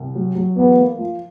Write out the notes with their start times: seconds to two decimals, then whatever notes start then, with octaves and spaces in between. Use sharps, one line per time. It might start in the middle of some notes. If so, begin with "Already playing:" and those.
Already playing: C2
0.15 F#3
0.35 F#3
0.56 E2 B3
0.77 A#3
0.98 F3